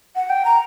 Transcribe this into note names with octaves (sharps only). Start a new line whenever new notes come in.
F#5
G5
A#5